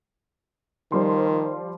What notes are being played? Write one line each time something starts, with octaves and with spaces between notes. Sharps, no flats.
D#3 F3 G3 C6